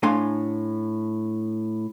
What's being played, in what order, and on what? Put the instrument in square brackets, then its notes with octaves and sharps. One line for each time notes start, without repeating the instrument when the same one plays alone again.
[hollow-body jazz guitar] A2 D4 F5 G#5 C6